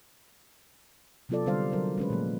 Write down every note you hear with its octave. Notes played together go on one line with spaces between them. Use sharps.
C3 F#3 B3 F4 A4 D5
D3 G3 C4 C5 F5
F#3 A#4 C5
G#3 C#4 B4
A#2 F3 A3 A#3